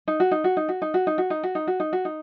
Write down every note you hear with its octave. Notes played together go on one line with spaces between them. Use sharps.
D#4
F#4
D#4
F#4
D#4
F#4
D#4
F#4
D#4
F#4
D#4
F#4
D#4
F#4
D#4
F#4
D#4